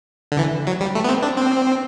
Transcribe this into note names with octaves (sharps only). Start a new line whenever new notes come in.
D3
E3
F#3
G3
A3
B3
C4
D4
C4